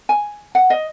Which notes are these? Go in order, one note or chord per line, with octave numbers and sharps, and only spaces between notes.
G#5
F#5
D#5